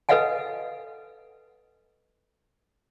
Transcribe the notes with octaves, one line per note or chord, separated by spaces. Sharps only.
A4 B4 D#5 F5 F#5 G#5